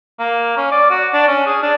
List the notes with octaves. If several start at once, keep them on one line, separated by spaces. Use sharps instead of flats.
A#3
C#4
D5
F#4
D4
C#4
G#4
D4